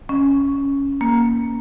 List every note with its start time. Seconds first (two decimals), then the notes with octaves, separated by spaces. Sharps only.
0.09 C#4
1.01 A#3